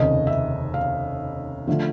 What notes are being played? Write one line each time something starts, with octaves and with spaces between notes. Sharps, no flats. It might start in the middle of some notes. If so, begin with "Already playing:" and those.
Already playing: F1 D#2 C#3 D#5
E5
F5
D3 F3 A3